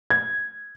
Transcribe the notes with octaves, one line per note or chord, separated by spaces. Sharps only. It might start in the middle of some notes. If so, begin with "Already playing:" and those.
G#6